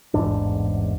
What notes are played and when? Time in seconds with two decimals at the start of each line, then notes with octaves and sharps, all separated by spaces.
0.14 A1 E2 G#2 D4